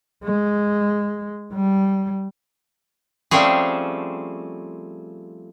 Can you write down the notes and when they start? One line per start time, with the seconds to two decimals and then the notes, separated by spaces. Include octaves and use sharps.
0.24 G#3
1.53 G3
3.31 F3 G3 A3 C4 C#4 G#4